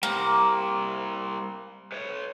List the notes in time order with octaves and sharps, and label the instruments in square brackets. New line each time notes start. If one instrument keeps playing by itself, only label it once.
[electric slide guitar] G3 C4 [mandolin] A#3
[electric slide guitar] B4 C#5